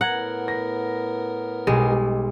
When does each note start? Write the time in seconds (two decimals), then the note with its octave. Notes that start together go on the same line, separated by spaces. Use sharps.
0.01 A2 B3 A#4 F#5 A#5 G#6
0.48 A#6
1.67 B1 G3 G#3
1.89 G3